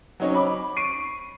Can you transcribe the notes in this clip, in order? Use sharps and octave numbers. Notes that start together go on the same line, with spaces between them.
F#3 C4 C#4 D#4 C#5
B5 D6
C#6 C7 D7 D#7